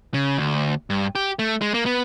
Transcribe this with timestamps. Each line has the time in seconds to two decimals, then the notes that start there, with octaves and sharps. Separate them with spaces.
0.14 C#3
0.38 D2
0.90 G2
1.15 G4
1.39 A3
1.61 G#3
1.74 A#3
1.86 B3